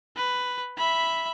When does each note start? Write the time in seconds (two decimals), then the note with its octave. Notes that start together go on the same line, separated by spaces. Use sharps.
0.17 B4
0.78 E5 B5